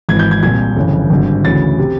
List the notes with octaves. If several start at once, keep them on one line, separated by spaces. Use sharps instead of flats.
G#1 G#2 E3 G#6
G6
G#6
C2 A#2 G#6
G1 F2 C#3 E3
G#1 G2 D3
D2 C#3 E3 A6
C3